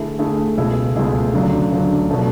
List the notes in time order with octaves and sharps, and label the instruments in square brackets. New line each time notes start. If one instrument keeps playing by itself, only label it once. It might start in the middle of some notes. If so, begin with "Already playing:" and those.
Already playing: [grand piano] D3 A3 E4 G#4
D3 A3 E4 G#4
C#2 B2 A3 E4 G#4
C#2 B2 A3 E4 G#4
D2 C#3 F#3 A3 D4
D2 C#3 F#3 A3 D4
B2 F#3 A3 D4